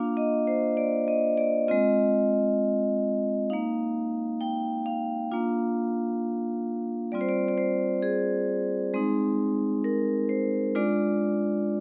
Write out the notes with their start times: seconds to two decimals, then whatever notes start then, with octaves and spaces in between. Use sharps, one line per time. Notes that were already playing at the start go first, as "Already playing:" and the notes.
Already playing: A#3 D4 F4 F5
0.17 D#5
0.47 C5
0.77 D5
1.08 D#5
1.37 D5
1.68 G#3 C4 F4 D#5
3.50 A#3 D#4 F5
4.41 G5
4.86 F5
5.32 A#3 D4 F4
7.12 G3 C4 F4 D5
7.21 C5
7.29 D5
7.48 D5
7.58 C5
8.03 G#4
8.94 G#3 C4 D#4
9.84 A#4
10.29 C5
10.75 G#3 D4 F4 D5